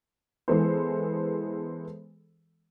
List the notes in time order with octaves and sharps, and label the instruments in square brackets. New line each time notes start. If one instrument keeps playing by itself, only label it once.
[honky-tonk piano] E3 G#3 B3 G#4 A4 C5